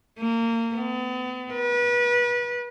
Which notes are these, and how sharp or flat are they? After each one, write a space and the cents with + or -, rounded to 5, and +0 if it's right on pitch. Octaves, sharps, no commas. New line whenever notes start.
A#3 -25
B3 +40
B4 -30